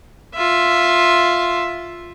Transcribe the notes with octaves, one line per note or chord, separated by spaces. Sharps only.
F4 E5